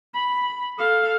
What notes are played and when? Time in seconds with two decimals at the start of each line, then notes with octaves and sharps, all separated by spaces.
0.14 B5
0.78 A4 F5